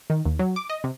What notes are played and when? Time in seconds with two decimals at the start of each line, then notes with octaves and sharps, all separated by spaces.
0.10 D#3
0.26 D#2
0.39 F#3
0.56 D6
0.70 D#5
0.84 C3